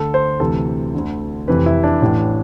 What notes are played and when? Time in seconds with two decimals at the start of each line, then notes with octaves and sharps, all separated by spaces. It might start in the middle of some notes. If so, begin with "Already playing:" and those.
Already playing: D2 D3 A4
0.14 C5
0.40 D2 C3 E3 A4
0.95 D2 D3
1.47 F1 F2 C3 E3 B4
1.66 E4
1.83 D4
2.02 A1 A2 E3